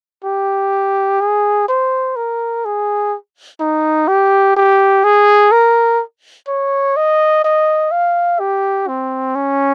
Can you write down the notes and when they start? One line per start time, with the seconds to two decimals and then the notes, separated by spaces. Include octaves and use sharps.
0.24 G4
1.20 G#4
1.68 C5
2.16 A#4
2.65 G#4
3.60 D#4
4.08 G4
4.57 G4
5.04 G#4
5.52 A#4
6.48 C#5
6.97 D#5
7.44 D#5
7.92 F5
8.40 G4
8.88 C4
9.35 C#4